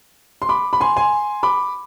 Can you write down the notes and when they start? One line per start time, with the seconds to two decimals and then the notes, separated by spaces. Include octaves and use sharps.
0.42 C6
0.49 B5 D6
0.73 B5
0.80 G#5 C6
0.96 G#5 C6
1.43 B5 D6